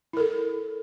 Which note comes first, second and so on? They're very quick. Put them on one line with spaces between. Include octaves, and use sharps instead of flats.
E4 A#4 A4